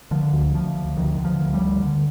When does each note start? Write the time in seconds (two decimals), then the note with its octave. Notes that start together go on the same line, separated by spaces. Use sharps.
0.11 D3 F3
0.33 D2
0.54 D2 F3
0.76 D2
0.97 D2 D#3
1.18 D3
1.25 F3
1.40 D2
1.54 G3
1.61 D2
1.82 D3